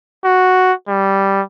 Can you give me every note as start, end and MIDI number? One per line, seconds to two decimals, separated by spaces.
0.25 0.73 66
0.88 1.42 55